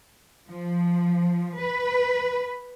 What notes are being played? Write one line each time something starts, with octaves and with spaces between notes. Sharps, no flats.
F3
B4